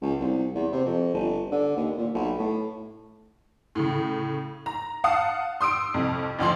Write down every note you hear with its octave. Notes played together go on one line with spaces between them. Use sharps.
C#2
C2
E2
C3
F2
G1
D3
D#2
A#2
B1
A2
A2 C#3
A#5
F5 F#5 A5 D#6
C6 D#6 E6 D7
C2 F2
A1 D2 F3 C6